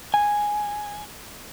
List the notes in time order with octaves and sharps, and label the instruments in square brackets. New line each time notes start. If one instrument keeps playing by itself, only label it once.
[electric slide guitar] G#5